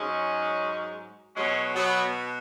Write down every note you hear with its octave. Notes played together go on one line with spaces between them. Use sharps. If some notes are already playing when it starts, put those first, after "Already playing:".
Already playing: G#2 F#3 G#3 C#4
B2 F#3 G#3 C#4
F#3 B3